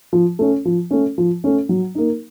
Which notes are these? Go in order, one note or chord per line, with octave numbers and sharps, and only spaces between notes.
F3
A3 C#4
F3
A3 C#4
F3
A3 C#4
F#3
A#3 D#4